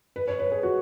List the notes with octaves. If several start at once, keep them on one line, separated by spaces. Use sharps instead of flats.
B4
C#5
B4
G#4
F#4